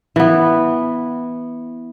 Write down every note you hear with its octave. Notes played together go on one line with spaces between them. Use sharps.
E3 B3